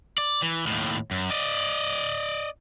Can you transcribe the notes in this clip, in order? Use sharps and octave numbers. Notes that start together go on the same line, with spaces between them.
D5
E3
D#2 A2
F#2
D5 D#5